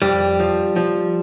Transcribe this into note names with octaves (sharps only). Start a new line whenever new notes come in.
F2 G3
F3
F3